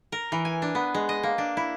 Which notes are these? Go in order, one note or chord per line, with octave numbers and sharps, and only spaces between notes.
A#4
E3
G#5
D4
B3
G#3
D#5
A#3
D4
E4